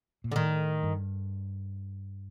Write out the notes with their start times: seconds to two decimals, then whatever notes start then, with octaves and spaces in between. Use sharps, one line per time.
0.24 A#2
0.32 D3
0.36 A2 D#3
0.83 G2